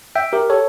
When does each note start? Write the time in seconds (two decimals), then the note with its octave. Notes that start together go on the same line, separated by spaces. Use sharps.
0.15 E5 G5
0.33 G4 A#4
0.50 A4 C#5